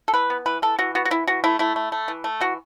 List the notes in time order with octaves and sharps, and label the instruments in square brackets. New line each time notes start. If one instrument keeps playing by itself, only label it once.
[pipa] A4
E3 B4
B3
E3 B4
E3 A4
E3 F#4
B3 F#4
F#4
E3 E4
E3 F#4
A3 E4
A3 E4
A3
A3
E3
A3
E3 F#4